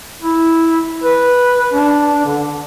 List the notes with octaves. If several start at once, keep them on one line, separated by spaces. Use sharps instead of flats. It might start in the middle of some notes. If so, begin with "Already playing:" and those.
E4
B4
D4
D3